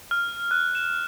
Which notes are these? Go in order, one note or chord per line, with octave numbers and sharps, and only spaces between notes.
F6
F#6
E7